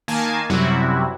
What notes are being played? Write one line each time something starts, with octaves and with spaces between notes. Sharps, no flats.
D#3 A#3 G#5 A5
F#2 C3 F#3 G3 E4 F#4